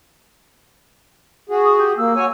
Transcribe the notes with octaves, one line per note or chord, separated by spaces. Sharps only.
F#4 G#4
D#6
G4
A#3 E6
F#4 C#5 G#5